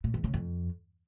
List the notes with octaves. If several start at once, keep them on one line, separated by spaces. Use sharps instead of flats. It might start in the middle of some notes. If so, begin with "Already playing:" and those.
A#2
E2
C#3
F2